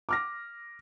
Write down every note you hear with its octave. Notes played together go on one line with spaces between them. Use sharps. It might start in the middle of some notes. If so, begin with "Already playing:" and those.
D6 F6 A#6